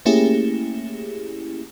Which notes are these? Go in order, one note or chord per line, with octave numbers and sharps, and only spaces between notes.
A3 A#3 C#4 E4 G4 G#4